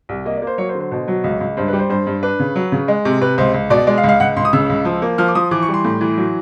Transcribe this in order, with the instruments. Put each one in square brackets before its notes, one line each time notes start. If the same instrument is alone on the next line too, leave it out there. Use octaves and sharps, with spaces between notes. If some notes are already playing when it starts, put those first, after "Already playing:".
[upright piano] C2
A#3 D#5
D5
A#3
C5
F#3 C#5
C5
D3
C5
B2 C5
F#3
C#2
C#2
G2 C5
B4
G3
C5
G2 C5
G2
D4 B4
C#3
F#3
C#3
G#3
C3
C3 B4
C#2 C5
C#2
B2 D5
G#3 D5
F5
C#2
F5
C#2 F#5
C#2 C6
D#6
C#3 E6
C#2
F3
A#3
F3 F6
D6
F3 D#6
E3 D6
C#6
G3
C6
A2
E3
F#3